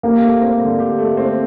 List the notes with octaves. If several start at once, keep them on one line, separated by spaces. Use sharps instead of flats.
A#3 G4
A3
C4
D3
G4
A3
C4